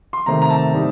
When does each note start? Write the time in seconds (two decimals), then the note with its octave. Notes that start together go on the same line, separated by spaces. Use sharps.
0.13 C6
0.26 C3 D#3 A3 C4 A#5
0.42 A#5
0.50 A5
0.74 A2 G3 C4 D#4